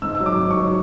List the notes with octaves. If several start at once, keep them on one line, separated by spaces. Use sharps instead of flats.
G#2 E6
E6
F#3
D6
G#2
C#6
F#3